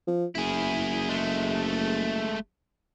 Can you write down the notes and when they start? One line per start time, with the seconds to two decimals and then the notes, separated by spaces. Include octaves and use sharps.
0.08 F3
0.35 F#1 E4 G#4
1.09 G#3 A3